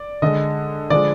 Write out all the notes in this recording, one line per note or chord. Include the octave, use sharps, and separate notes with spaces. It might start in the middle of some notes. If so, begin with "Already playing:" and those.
Already playing: D5
D3 G#3 D#5
D3 F3 G#3 D5